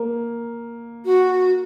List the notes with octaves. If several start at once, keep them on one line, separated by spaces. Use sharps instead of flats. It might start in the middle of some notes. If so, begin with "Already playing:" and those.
Already playing: A#3
F#4